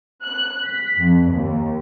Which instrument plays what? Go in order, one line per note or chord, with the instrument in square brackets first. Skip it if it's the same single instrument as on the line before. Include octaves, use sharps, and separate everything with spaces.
[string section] F#6
B6
F2
D#2